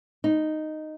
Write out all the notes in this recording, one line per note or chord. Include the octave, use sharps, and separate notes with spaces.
D#4